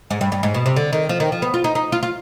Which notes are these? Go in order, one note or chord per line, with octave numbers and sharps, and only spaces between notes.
G#2
G2
G2
G#2
B2
C3
D3
D#3
F3
D#3
F3
B3
F4
D#4
D#4
F4
F4